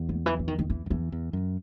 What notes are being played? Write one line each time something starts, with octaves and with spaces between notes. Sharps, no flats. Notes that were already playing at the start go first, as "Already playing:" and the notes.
Already playing: E2
B3
D#3
E3
E3
D#3
D#3
E3
F#2
E2 E3
E2
F#2